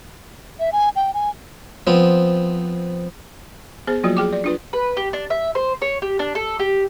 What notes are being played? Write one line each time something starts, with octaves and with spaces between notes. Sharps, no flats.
E5
G#5
G5
G#5
F3 B3 C4
B3 G#4 C5
F3 F#3 A#3 F4 F#4
G#4 G5 D6
D5
D4 F4 B4
B4
G4
D4
E5
C5
C#5
G4
D4
A4
G4